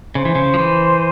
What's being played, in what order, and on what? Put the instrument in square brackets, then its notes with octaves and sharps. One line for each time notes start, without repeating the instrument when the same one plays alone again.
[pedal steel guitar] C#3 [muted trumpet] C5
[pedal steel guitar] E3
C#3
F3
E3